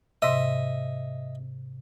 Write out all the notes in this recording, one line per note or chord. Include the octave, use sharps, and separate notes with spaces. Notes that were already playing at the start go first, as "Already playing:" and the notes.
G#2 C3 D#5 E5